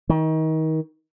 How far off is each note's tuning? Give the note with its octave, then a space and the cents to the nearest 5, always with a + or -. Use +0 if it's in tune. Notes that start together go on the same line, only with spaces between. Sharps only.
D#3 +30